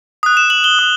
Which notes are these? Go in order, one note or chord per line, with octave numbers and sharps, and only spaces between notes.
D#6 F#6
E7
F#7
G7
D#6